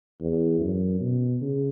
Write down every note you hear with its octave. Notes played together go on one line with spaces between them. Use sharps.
E2
F#2
B2
C#3